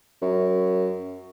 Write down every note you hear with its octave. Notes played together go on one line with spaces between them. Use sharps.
F#2